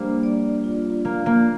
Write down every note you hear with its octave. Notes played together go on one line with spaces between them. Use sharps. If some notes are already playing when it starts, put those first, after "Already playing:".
Already playing: G3 A#3 D4 C5
D5
F4
A#3 F5
A#3